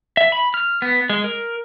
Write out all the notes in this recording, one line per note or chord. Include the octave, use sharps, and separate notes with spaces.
E5
B5
F6
B3
G#3
A#4